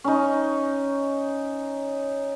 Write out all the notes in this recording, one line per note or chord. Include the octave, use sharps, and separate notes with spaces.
C#4 D#4